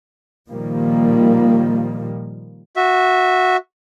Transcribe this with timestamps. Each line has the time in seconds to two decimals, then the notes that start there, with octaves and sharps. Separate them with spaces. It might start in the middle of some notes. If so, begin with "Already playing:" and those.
0.49 A#2 D#3 F3 G3 A#3
2.76 F#4 E5